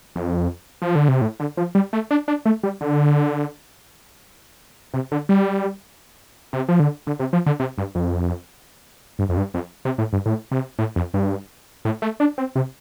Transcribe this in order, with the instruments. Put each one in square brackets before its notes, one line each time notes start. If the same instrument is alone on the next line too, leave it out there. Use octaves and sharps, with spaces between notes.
[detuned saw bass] F2
F3
D3
C3
A2
D3
F3
G3
A3
D4
D4
A3
G3
D3
C3
D3
G3
C3
F3
D3
D3
C3
F3
D3
C3
G2
F2
G2
F2
G2
F2
C3
A2
G2
A2
C3
A2
F2
G2
A2
A3
D4
C4
C3